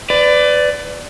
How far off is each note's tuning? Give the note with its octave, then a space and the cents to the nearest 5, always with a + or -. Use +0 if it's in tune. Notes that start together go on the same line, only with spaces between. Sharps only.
B4 +30 D5 +0